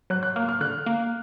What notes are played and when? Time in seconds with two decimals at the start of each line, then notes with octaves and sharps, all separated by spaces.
0.10 F#3 F#6
0.23 F#6
0.36 A#3 F6
0.49 F6
0.61 D3 F#6
0.86 A#3